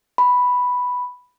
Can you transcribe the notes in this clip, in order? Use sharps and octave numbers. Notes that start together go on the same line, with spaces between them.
B5